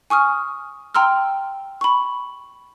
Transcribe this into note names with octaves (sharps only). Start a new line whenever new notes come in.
G#5 C#6 D#6 F6
G5 A#5 C6 E6 F6
B5 C#6